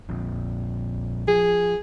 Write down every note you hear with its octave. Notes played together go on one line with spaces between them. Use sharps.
A#1 F2
F3 G#4